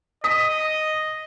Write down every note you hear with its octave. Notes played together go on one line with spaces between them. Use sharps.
D#5 D#6 B6